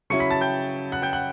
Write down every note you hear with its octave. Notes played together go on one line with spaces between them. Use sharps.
C#3 F#3 C#4 E4 C#6 C#7
B5 B6
A5 A6
G5 G6
F#5 F#6
G5 G6
F#5 F#6